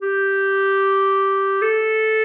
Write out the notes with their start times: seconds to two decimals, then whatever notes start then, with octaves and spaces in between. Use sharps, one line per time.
0.02 G4
1.62 A4